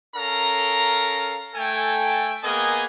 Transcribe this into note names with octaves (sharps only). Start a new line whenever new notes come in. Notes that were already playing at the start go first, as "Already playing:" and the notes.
C#4 A4 A#4 F5 A#5
A3 A4 G5 G#5
A#3 B3 G#4 A#4 D#5 G#5